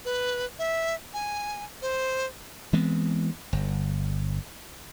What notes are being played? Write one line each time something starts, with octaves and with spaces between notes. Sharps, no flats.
B4
E5
G#5
C5
E3 G#3 B3 C4
G1